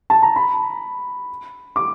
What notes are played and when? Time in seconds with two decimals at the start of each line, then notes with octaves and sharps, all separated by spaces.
0.10 A5
0.22 A#5
0.36 B5
1.76 D6